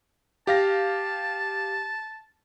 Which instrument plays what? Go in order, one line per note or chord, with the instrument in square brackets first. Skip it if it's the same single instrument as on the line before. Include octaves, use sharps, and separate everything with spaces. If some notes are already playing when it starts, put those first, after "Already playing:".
[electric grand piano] G4 F5 A#6 [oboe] A5